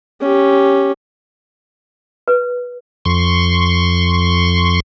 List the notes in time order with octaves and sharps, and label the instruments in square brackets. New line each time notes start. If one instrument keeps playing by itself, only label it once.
[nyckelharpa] C#4 G4
[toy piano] B4
[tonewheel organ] F2 C6 C#6